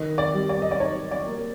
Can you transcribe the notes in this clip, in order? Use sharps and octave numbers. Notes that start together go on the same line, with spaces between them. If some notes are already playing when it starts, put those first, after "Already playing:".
Already playing: D#3 D#5
D5
G3
D5
D#5
D5
D#4 C#5
D5
A#3